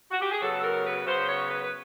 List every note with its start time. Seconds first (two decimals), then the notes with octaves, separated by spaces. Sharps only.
0.11 F#4
0.21 G4
0.31 G#4
0.41 C#3 F#3 B3 A4
0.63 A#4
0.84 B4
1.06 C#3 F#3 B3 C5
1.28 C#5
1.50 B4
1.64 B4